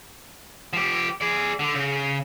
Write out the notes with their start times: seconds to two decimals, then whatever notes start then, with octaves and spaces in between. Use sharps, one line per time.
0.73 F3 G4
1.21 G#4 D5
1.59 D3
1.75 C#3